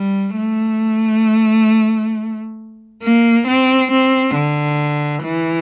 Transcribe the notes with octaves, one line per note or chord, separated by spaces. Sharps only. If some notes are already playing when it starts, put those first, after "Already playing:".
Already playing: G3
A3
A#3
C4
C4
D3
E3